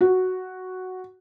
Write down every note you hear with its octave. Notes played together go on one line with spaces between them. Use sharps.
F#4